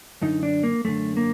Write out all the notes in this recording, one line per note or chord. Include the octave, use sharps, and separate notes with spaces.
F#2 D3 D#4
D4
A#3
F#2 D3 A3
A#3